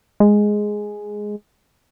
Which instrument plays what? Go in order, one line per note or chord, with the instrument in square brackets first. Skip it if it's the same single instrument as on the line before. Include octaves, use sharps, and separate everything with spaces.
[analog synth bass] G#3